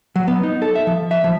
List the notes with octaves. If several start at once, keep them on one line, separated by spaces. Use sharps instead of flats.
F#3
B3
D#4
A4
E5
F3
E5
F3